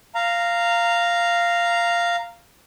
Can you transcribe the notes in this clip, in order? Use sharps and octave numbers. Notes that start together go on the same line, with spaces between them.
F5 A#5